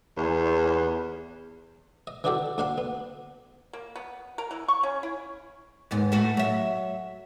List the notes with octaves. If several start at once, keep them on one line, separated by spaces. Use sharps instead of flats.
E2
D#5
E3 D4 D#4 F#4 G4 A4
D2 D4 F5 F#5 C6
B3
A#3
B3
A#4
E3
C#6
C#4
E4
D#2 G#2 B3
A2 A3 F#4
F#3 E5